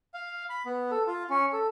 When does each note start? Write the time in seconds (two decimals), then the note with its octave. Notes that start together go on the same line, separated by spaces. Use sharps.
0.14 F5
0.50 B5
0.66 B3
0.91 A4
1.07 F4
1.30 C#4
1.53 A4